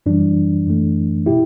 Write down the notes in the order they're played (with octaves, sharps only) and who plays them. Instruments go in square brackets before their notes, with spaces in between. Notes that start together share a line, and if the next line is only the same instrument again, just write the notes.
[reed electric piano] F#2 E3 G3 D4
F#2 E3 A3
B2 E4 G4